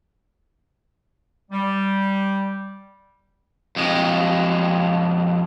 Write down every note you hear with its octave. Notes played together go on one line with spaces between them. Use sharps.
G3
F2 G#3